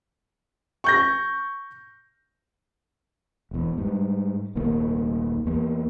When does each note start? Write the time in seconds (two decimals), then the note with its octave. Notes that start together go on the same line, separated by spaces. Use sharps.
0.84 C#6 G6 A#6
3.51 E1 E2
3.78 G#2 G3
4.55 D#1 C2 D#3 A#3
5.46 E2 A#3 B3